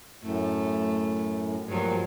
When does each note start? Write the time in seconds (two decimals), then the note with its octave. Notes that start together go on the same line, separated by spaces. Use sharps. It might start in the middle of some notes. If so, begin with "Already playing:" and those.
0.22 F#2 A2 A3
1.68 G2 A#2 F3 F#3